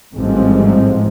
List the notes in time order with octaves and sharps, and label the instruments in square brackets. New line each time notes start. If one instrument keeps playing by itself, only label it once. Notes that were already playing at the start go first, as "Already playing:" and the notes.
[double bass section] A1 G#2 F3 G3 G#3 C4